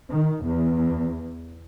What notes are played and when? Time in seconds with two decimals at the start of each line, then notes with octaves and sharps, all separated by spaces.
0.11 D#3
0.46 E2